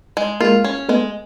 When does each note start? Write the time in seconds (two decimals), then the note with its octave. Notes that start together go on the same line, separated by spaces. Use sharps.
0.17 G#3
0.40 G#3 A#3 F4
0.64 C#4
0.89 G#3 A3 B3